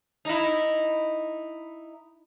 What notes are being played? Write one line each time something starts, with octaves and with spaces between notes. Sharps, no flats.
D#4 E4